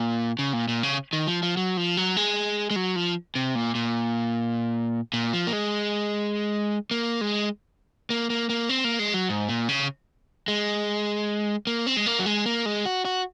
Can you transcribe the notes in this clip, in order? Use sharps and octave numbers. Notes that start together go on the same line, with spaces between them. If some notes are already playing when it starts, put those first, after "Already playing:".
Already playing: A#2
C#3
A#2
A#2
C#3
D#3
F3
F3
F#3
F3
F#3
G#3
G#3
F#3
F3
C3
A#2
A#2
A#2
F3
A#3
G#3
A#3
G#3
A#3
A#3
A#3
C4
A#3
G#3
F#3
G#2
A#2
C#3
G#3
A#3
C4
G#3
A#3
F#3
G#3
A#3
G#3
F#4
F#4